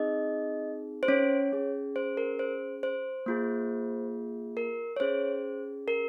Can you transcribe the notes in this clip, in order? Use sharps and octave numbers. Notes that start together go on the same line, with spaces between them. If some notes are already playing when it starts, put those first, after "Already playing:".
Already playing: C4 D#4 G#4 D#5
C5
C#4 C#5
C#4 G#4
C5
A#4
C5
C5
A#3 F4 G#4
A#4
C#5
C#4 G#4 C5
A#4